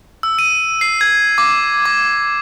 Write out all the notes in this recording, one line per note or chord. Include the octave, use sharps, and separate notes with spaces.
E6
D#7
C7
G#6
D6
D6